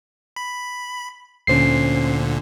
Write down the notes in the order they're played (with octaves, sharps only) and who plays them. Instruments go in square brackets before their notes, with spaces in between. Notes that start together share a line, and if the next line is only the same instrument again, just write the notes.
[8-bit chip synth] B5
[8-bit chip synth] D2 A#2 D3 [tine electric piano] C#4 C5 C7